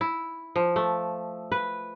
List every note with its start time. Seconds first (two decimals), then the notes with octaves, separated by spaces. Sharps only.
0.01 E4
0.56 F3
0.76 A3
1.52 B4